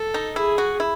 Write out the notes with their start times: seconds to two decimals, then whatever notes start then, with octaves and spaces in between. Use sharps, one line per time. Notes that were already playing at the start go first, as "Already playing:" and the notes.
Already playing: A4
0.14 D#4
0.36 E4 G#4
0.58 F#4
0.80 E4